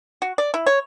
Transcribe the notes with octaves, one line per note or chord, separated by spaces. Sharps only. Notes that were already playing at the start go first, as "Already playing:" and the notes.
F#4
D5
E4
C#5